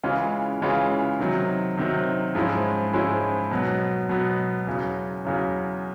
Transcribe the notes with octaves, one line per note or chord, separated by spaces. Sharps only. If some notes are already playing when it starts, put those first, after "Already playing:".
C#3 E3 G#3 C#4 F4
C#3 E3 G#3 C#4 F4
C3 D#3 F#3
C3 D#3 F#3
G#2 F3 G#3 C#4 E4
G#2 F3 G#3 C#4 E4
B2 F#3 B3
B2 F#3 B3
E2 C#3 F#3
E2 C#3 F#3